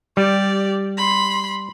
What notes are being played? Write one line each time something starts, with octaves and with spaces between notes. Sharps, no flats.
G3 G4 D5
B5 C6